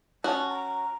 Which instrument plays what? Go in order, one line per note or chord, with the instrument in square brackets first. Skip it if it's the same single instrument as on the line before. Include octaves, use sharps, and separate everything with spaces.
[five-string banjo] C#4 F#4 [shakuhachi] A5
[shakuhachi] A#5